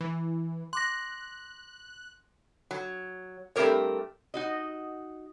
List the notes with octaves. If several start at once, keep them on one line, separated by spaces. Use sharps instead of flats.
E3
C6 D6 F#6 A#6
F#3
G2 A3 C4 G4 A#4 C#5
D#4 F#4 D#5